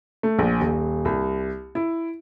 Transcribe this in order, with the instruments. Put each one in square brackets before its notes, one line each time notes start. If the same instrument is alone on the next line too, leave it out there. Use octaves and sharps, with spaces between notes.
[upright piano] A3
A#1
D#1
C2
E4